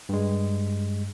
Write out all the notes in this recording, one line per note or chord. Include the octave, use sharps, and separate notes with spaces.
G2 G#3